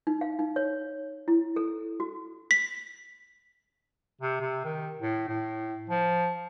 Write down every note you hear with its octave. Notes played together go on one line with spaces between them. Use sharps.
D#4
F5
D#4
C#5
E4
A4
F#4
B6
C3
C3
D#3
A2
A2
F3